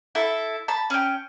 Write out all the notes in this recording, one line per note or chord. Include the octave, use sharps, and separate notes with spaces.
E4 A4 E5
A5 B5
C#4 G5